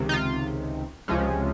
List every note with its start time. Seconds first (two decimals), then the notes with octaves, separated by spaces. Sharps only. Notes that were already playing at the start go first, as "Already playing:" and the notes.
Already playing: C#2 C3 D#3
0.09 D#4
0.13 F4
1.08 C#2 C3 F3 G#3 C#4